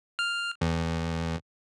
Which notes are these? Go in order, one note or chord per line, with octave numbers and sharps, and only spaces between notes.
F6
E2